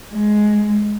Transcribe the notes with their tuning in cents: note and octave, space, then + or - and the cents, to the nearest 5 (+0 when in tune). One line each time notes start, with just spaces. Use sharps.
G#3 +10